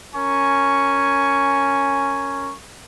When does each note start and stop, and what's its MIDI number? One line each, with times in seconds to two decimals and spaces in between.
0.15 2.53 61
0.15 2.53 70
0.15 2.53 80
0.15 2.53 85